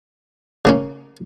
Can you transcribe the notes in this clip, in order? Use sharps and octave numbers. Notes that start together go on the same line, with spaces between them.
C#3 A#3 C#4